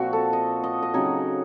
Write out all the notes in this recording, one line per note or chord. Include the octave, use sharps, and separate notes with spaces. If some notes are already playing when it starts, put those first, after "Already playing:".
Already playing: A#2 F3 C4 F#4
A4
D#5
D#5
D#5
C#3 F#3 C4 D#4 C#5